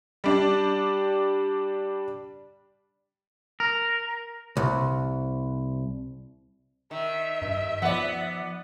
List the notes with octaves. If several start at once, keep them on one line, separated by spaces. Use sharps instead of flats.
G3 D4
A#4
C2
D#3 E5
G2
F3 B3 D5 F#5